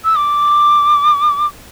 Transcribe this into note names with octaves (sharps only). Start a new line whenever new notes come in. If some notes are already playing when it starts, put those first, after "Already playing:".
E6
D6